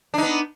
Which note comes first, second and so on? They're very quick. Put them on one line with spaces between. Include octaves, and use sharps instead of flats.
D4 D#4 B3